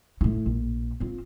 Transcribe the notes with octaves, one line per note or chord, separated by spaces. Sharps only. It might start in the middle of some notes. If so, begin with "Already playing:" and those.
A2 E4
A#1
C4 F4